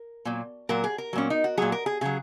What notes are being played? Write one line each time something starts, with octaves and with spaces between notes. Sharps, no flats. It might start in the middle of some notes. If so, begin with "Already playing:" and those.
Already playing: A#4
A#2 F#3
A#2 F#3 A#4
G#4
A#4
A#2 F#3 C#4
D#4
F#4
A#2 F#3 G#4
A#4
G#4
C#3 F#3 G#4